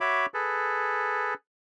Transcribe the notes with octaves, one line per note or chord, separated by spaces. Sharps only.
F#4 C#5 E5 B5 D6
G#4 A4 B4